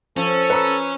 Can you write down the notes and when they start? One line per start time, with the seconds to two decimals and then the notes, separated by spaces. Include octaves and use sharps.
0.17 F3 C#4 A4
0.50 B4 A#5 E6